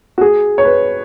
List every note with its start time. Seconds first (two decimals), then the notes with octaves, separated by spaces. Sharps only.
0.18 F#4
0.21 G#4
0.58 C#5
0.64 B4